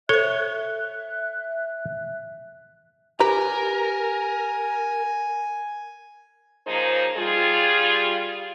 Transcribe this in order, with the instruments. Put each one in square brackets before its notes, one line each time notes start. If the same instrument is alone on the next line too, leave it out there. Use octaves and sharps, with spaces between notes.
[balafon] A4 C5 [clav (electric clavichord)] C#5 [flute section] E5 F#6
[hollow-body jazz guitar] G4 B4 A#5 [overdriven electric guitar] A#4 [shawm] G#5
[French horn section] C#3 F3 A#3 D#4 G#4 C5
G3 F4 G#4